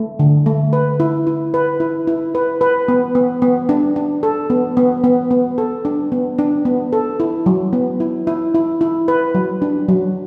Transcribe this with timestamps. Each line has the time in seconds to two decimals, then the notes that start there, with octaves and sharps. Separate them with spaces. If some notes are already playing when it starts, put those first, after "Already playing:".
Already playing: A3
0.19 D3
0.46 A3
0.73 B4
1.00 E4
1.27 E4
1.54 B4
1.80 E4
2.08 E4
2.35 B4
2.61 B4
2.88 B3
3.15 B3
3.42 B3
3.69 D4
3.96 D4
4.23 A4
4.50 B3
4.77 B3
5.04 B3
5.31 B3
5.58 A4
5.85 D4
6.12 B3
6.38 D4
6.65 B3
6.93 A4
7.20 E4
7.46 F#3
7.73 B3
8.00 E4
8.27 E4
8.55 E4
8.81 E4
9.08 B4
9.35 F#3
9.62 D4
9.89 F#3